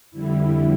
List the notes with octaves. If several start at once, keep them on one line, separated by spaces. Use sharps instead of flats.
F2 D3 G3 E4